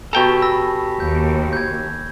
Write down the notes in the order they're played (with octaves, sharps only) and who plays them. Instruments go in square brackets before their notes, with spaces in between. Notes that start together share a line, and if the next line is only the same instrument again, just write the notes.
[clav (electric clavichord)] B2 G5 A#5 [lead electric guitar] G4 A4 [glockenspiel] G#5 C#6
[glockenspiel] B5 E6 A#6
[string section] D#2 [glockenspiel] G6
[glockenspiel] G6 G#6